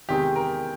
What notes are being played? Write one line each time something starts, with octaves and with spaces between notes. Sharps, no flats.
E2 C3 D#3 G#3 G4
A#4